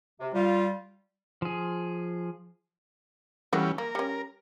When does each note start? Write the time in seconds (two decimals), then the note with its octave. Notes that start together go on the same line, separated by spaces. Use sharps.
0.20 C3
0.34 G3 F4
1.42 F3 G#4
3.53 E3 G3 A3 B3 C#4 F#4
3.78 A#3 A#4
3.95 G3 C#4